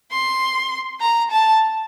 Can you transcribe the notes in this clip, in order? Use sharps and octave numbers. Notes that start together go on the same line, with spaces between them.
C6
A#5
A5